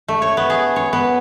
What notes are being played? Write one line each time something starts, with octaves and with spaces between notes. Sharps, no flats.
A3
C#5
B3
G#4
C#5
B3